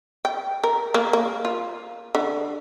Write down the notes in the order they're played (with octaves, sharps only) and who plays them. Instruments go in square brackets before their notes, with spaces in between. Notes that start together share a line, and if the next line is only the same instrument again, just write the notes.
[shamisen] G5
A#4
A#3
A#3
F4
D3